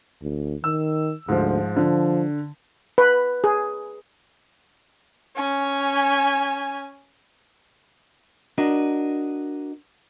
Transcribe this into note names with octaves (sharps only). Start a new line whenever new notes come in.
D2
D#3 E6
D2 G#2 F3
D3 F3
B4
G#4
C#4 G#5
D4 F#4 A#4 D#5